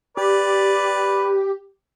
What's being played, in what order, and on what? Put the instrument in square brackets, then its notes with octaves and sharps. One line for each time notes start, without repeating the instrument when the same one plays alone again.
[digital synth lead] G4 [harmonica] B4 D5